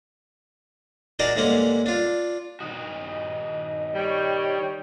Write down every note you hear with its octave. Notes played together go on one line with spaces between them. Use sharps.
D4 D#4 F#4 G#4 A#4 D5
G2 D3 G#3 A#3 C#4 F#5
D4 F4
D#3 D#4 F#4 D#5
G3 C#5 G5